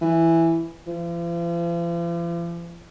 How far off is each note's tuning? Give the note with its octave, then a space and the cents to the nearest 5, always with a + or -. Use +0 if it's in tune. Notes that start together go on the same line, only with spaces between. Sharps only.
E3 +5
F3 -45